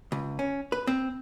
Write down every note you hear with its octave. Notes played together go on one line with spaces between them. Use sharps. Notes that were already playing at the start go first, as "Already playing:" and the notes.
C#2
C#4
B4
C4